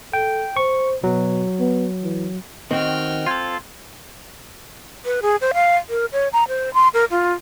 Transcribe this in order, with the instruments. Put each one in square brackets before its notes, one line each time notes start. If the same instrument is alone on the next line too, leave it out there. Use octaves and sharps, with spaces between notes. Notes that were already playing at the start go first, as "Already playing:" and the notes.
[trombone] A4 [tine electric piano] G5
[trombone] C5 [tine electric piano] C#6
[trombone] B2 [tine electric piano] F#3
[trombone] B3
E3
[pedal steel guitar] D#3 F#4 [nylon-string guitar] C4 [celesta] D#5 [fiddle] G5 F6
[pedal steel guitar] F4 A4 [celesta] C6 G6 G#6
[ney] B4
G#4
C5
F5
A#4
C#5
A#5
C5
C6
A#4
F4